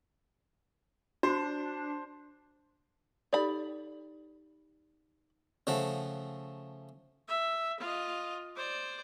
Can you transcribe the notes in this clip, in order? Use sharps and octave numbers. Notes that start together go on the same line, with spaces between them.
D4 F#4 C5
D#4 G4 A4 D5 B5
C#3 F3 A3 F#5
E5
F4 D#5
C5 D5